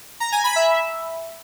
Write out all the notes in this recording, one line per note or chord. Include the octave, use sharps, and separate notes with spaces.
A#5
G#5
B5
E5